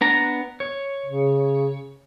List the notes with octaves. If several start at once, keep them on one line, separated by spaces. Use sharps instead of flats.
B3 D4 A#5
C#5
C#3